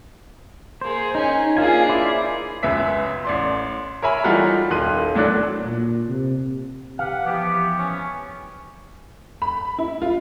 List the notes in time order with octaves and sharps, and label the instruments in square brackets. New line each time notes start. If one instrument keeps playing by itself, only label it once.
[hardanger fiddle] A#3 G#4 [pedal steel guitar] C5
[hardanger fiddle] C#4 G#5 [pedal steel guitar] D#4
[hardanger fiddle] A#3 G#4 [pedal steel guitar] D4 F4 G#5
[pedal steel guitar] E4 C5 D5
[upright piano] C#2 F#2 B4 E5 B6
A1 D5 C6
A#4 C#5 E5 G#5 B5
E3 G3 D#4 F4 F#4 A4
D#1 D#3 C6 F#6 D#7
A2 F#3 D4 D5 F#6
[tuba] A#2
C3
[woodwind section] G4 B4 F#5 [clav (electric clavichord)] F5
[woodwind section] E3 F3 B3 [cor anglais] G4
[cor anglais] C#4
[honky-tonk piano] B5
E4
F4